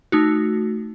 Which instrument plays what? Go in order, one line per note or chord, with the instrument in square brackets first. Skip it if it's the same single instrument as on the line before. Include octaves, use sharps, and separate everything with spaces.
[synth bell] A3 D#4 F#4